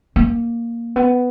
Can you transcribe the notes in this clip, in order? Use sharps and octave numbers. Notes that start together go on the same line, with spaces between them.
A#3
B3